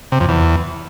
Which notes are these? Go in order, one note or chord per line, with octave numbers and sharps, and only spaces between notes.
C3
F2
E2